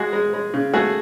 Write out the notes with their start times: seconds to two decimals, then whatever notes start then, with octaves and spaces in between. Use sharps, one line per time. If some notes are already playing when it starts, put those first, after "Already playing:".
Already playing: G#3 F#4 G#4
0.13 G#3
0.33 G#3
0.54 C#3
0.74 A3 F#4 G#4